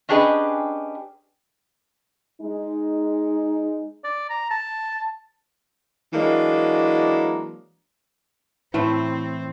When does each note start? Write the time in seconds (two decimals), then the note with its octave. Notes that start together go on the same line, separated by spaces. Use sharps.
0.09 C#4 D4 G4 G#4 B4 D#5
2.41 G#3 D#4
4.04 D5
4.30 A#5
4.50 A5
6.13 E3 F#3 G#3 A#3 D4
8.74 A2 E3 A3 C4 E4